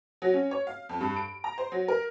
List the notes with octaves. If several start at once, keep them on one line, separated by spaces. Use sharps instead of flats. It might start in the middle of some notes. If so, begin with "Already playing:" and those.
F#3
C#4
C#5
F5
F2
G2
D7
A#5
C5
F#3
A#4